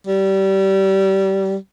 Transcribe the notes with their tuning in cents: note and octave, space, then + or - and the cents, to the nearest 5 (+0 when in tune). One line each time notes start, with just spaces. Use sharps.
G3 -25